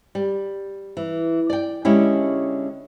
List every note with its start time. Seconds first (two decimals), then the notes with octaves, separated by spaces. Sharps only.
0.15 G3
0.97 E3
1.50 D5 G5
1.85 D3 G#3 C#4 E4 G4